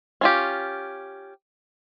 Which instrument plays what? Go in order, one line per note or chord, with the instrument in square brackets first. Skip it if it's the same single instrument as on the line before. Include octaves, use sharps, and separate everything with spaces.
[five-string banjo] C#4 F4 G4